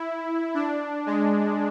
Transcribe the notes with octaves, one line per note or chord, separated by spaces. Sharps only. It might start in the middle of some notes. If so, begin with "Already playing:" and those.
Already playing: E4
D4
G#3